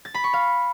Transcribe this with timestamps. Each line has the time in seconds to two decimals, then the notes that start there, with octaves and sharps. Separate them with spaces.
0.05 A6
0.14 B5
0.24 C#6
0.33 F5